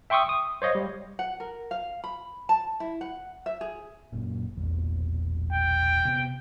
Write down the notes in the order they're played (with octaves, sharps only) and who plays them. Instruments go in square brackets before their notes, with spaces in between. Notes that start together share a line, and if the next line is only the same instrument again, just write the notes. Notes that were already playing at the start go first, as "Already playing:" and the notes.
[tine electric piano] E5 G5 C6 C#6 D#6 E6
D#6
C5 C#5 D#5 F5 A#6
G3
[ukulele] F#5
A#4
F5
B5
A5
E4
F#5
E5
G#4
[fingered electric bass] F#1 A#2
E1 A#1 E2
[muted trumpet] G5
[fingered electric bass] C3 B3